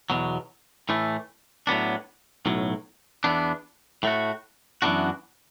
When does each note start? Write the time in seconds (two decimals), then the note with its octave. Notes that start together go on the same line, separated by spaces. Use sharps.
0.10 E2 B2 F#3
0.89 A2 E3 A3
1.67 A2 F#3 B3 D4
2.46 B1 A2 F#3
3.24 E2 E3 B3 D4
4.03 A2 A3 F#4
4.82 F#2 E3 B3 D4 F#4